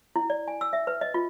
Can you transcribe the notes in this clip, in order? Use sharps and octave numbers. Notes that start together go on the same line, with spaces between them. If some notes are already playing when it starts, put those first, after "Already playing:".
E4
D5
G#5
E6
E5
B4
D#5
F4